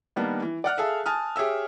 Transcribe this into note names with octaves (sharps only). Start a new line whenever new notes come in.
D#3 G3 A#3 B3 D4
E3
D5 F#5 F6 F#6
G#4 A4 E5 F5
G#5 A5 D#6 F6
G4 G#4 C#5 E5 E6